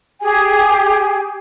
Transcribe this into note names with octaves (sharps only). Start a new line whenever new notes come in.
G4 G#4 G#5